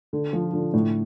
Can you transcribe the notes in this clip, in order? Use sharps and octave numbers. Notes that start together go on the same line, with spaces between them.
D3
F3
D3
A2